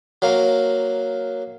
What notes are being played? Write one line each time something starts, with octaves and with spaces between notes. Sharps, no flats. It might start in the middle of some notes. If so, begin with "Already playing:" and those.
F#3 A#3